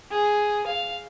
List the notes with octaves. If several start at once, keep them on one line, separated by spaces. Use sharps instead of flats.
G#4
F5